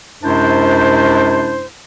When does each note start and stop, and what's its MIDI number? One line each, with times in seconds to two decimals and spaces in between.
0.23 1.67 42
0.23 1.67 48
0.23 1.67 56
0.23 1.67 62
0.23 1.67 64
0.23 1.67 72